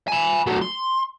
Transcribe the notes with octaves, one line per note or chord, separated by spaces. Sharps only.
G#5 B5
F#3 A3
C6